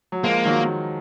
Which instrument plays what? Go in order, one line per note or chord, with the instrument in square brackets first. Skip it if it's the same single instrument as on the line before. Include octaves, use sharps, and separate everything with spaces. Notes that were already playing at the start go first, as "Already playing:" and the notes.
[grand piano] F#3
[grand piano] F3 G#3 [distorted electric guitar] A#3
[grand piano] D#3 F#3